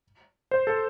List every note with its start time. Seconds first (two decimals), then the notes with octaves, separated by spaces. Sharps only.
0.51 C5
0.67 A4